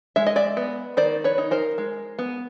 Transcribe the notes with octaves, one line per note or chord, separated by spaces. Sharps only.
G#3 E5
D#5
D5 E5
B3
D#3 C5 D5
B4 C#5
D#4
A#4 C5
G#3
B3